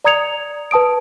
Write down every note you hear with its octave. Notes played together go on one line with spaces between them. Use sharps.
D5 A#5 D#6 G#6 C#7 F7
B4 A5 D#6 D7